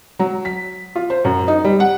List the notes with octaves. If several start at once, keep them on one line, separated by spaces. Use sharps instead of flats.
F#3
B6
F4
C5
F#2
D#4
G3
F#5